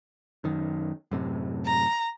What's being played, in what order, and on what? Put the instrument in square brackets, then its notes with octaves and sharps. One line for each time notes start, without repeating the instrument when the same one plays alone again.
[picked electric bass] F#2 D#3
F#2 A2 C3
[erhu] A#5